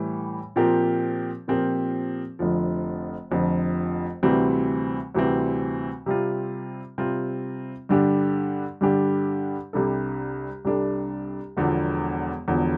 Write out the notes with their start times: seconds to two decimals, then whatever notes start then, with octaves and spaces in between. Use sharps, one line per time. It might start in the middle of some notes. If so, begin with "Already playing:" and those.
Already playing: A2 E3 G3
0.56 A#2 F3 C4 G4 A#4
1.48 A#2 F3 C4 G4 A#4
2.39 F1 F2 D3 F3
3.31 F1 F2 D3 F3
4.23 D2 C3 E3 G3 C4
5.15 D2 C3 E3 G3 C4
6.06 C3 G3 C4 F4
6.98 C3 G3 C4 F4
7.89 G2 D3 G3 D4 G4
8.81 G2 D3 G3 D4 G4
9.73 C2 C3 G3 D4 A4
10.65 C2 C3 G3 D4 A4
11.57 E1 E2 D3 F3
12.48 E1 E2 D3 F3